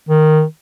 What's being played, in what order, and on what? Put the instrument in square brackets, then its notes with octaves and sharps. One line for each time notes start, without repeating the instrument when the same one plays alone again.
[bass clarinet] D#3